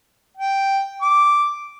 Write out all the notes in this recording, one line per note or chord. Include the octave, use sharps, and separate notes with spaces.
G5
D6